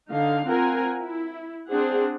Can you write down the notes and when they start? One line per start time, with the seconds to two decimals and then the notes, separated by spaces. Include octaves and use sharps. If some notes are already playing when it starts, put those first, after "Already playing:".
0.10 D3 D#4 F5
0.48 C4 F4 A#4 F#5 G#5 A#5
1.00 E4
1.70 C4 D4 G#4 F#5